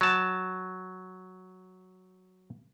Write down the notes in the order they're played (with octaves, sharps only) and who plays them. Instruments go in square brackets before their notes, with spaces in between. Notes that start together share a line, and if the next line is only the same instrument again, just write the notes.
[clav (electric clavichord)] F#3 A5